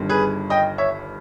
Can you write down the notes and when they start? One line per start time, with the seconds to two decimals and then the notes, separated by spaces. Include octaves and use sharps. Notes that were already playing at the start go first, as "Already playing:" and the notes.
Already playing: G1 G2 D#3
0.09 G#4 B4
0.50 D#5 G5
0.78 C#5 E5